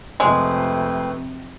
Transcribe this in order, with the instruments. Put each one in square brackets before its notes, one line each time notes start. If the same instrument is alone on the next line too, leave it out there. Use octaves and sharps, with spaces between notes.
[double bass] F2 C3 [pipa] G#3 [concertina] A3 C4 B4